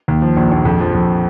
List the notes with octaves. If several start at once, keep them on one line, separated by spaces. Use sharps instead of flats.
D#2
F3
A#1
A#1
F2
F3
F2